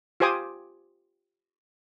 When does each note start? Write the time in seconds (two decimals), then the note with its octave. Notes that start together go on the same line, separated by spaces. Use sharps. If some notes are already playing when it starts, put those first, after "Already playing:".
0.20 F4 G4 C5 G#5 D6 D#6